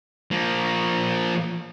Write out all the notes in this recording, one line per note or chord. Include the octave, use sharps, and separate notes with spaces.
F3 A#3